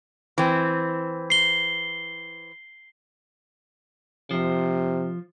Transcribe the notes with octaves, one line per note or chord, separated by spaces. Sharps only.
E3 C4
C7 G7
C3 F3